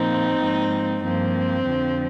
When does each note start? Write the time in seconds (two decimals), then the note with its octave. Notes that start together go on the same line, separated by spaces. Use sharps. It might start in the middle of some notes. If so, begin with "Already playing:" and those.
Already playing: A#2 F3 A#3 C4 D#4
0.39 G#2 F3 A#3
1.02 G2 F3 A#3 C4
1.65 F2 D3 F3